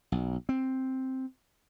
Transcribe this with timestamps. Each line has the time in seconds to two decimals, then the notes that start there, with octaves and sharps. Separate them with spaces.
0.12 B1
0.49 C4